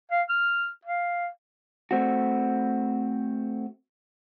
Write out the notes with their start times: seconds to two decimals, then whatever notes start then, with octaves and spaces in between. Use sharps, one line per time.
0.11 F5
0.29 F6
0.85 F5
1.91 A3 C4 F#4